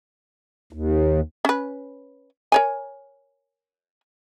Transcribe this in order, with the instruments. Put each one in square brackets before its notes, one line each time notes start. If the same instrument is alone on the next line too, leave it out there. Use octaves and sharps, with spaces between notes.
[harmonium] D#2
[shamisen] C#4 B4
A#4 C#5 G#5